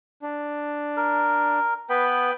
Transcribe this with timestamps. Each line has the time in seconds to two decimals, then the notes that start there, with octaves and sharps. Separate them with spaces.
0.22 D4
0.97 A#4
1.90 B3 B4 G5 B5